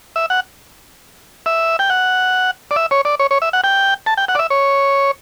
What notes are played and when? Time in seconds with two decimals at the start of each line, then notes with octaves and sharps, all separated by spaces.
0.16 E5
0.30 F#5
1.46 E5
1.79 G5
1.90 F#5
2.71 D5
2.76 E5
2.91 C#5
3.05 D5
3.20 C#5
3.31 C#5
3.42 E5
3.53 F#5
3.64 G5
4.06 A5
4.17 G5
4.28 F#5
4.35 D5
4.39 E5
4.50 C#5